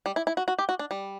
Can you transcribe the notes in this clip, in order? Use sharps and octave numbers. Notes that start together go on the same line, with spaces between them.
G3
E4
E4
F#4
F#4
G4
F#4
D4
G3